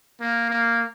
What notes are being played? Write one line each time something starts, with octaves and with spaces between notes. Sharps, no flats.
A#3
A#3